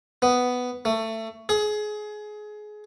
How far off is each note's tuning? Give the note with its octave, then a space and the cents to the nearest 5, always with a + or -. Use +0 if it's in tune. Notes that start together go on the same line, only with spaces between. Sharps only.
B3 +5
A3 +20
G#4 +25